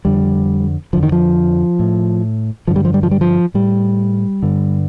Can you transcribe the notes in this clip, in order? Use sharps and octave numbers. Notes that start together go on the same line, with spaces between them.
F2 D3 G3
F2 D3 F3
D#3
F3
A2
G2 D3 F3
G3
F3
G3
F3
G3
F3
A2 G3
G2 D3